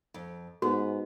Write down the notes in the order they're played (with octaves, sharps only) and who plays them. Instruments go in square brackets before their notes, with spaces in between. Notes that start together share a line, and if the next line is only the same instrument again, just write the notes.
[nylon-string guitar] F2
[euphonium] G#2 [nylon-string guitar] B3 [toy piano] F#4